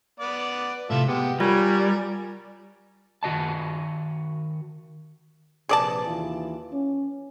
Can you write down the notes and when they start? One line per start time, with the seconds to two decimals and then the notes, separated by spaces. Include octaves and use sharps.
0.20 B3 B4 D5
0.90 A2 C3 A3 F4 A4 E5
1.08 G#3 B3 G4
1.40 G3 F4 A#4 C#5 G#5
3.23 D#3 F#4 D#5 A5
5.69 A#1 C3 G#4 B4 D5 A5
6.05 D#2 E3 F4
6.72 C#4